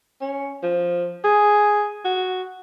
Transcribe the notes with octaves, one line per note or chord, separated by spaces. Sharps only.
C#4
F3
G#4
F#4